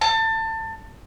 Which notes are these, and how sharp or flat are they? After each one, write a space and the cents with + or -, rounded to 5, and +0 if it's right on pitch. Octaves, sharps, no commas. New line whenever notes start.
A5 +25